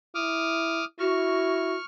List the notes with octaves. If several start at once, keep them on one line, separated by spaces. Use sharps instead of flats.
E4 D6 D#6 F6
E4 F#4 C#6 F6